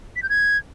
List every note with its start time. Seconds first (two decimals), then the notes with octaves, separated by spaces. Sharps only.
0.16 B6
0.23 G6
0.30 G#6